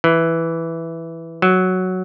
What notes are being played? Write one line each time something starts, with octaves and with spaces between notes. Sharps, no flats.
E3
F#3